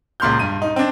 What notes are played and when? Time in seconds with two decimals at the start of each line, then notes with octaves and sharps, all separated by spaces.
0.20 C#2 A#2 C6 F6 G6
0.39 G2 D#7
0.62 D#4
0.76 C4 D4